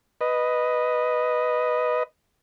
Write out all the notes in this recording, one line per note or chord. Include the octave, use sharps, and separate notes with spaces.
B4 D#5